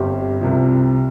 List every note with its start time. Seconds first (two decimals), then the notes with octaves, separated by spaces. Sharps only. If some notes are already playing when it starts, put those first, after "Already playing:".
Already playing: G1 G2 G3 C4 G4
0.41 C2 C3 F3